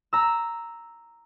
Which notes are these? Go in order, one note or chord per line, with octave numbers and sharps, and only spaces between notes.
A#5 E6